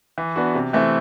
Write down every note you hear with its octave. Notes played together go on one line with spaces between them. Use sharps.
E3
B3 D4 F#4
C3
E3 A3 C4 E4